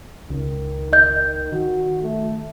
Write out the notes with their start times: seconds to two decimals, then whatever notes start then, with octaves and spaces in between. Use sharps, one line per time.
0.30 C#2 D#3
0.93 D#3 D#5 G6
1.52 D#3 F#4
2.03 A3